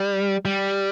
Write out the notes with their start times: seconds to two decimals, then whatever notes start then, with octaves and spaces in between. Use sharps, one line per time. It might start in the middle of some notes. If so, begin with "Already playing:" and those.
Already playing: G3
0.45 G3